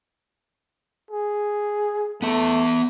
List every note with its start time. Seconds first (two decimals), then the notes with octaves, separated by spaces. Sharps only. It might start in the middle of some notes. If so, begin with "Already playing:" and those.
1.11 G#4
2.22 A3 B3 E5